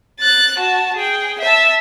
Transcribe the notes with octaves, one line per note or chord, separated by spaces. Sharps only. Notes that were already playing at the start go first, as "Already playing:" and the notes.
F#6 A6
F#4 A5
G#4 G5
E5 A5